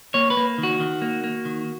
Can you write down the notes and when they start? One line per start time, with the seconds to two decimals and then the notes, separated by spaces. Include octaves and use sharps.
0.14 A#3 C#5
0.30 B4
0.37 A#3
0.58 D#3
0.63 F#4
0.80 D#3
1.02 A#3
1.24 A#3
1.45 D#3